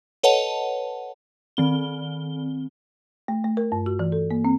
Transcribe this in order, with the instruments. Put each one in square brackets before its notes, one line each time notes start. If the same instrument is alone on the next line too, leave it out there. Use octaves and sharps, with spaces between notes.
[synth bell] A4 B4 C#5 D#5 F#5 A5
D#3 C4 G7
[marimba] A3
A3
A#4
G2
F#4
E3
A4
A#3
C4